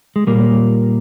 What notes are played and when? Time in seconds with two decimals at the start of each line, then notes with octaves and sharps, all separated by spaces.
0.16 G#3
0.27 A#2 G3 A#3